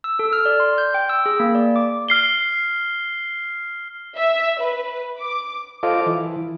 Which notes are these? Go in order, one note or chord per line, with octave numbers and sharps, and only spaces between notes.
E6
A4
F6
D5
C6
G6
G5
E6
G#4
A#3
D5
D6
F6 C7 G7
E5
B4
D6
F4 A4 C5 D#5 F5 D6
E3